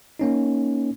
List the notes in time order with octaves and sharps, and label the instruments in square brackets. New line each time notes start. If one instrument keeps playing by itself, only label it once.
[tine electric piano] A#3 C#4 D#4